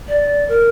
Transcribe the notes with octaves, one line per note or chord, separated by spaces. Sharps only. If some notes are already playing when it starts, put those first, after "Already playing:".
D5
A#4